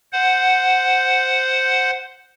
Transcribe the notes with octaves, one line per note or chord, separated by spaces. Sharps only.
C5 F#5